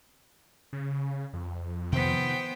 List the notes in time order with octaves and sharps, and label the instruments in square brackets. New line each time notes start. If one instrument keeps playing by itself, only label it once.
[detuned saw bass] C#3
F2
[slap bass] C3 D#3 F3 [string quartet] B3 C5 G5